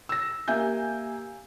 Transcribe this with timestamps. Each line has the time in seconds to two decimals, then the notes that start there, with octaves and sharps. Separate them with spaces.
0.09 E6 A#6
0.48 A#3 G4 E5 G#5 G6